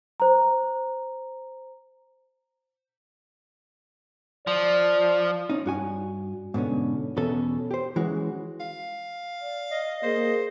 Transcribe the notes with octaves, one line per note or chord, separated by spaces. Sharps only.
C5 A#5
F3 D5
C#4 D#4
G2 F#4 G#5
G#2 B2 D3 C#4
E2 B2 C#4 A4
G4 C5
E3 G#3 C#4 F#4
F5
D5
D#5
A#3 G#4 C5